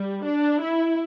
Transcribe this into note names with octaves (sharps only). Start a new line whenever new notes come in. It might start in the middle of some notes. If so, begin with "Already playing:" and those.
Already playing: G3
D4
E4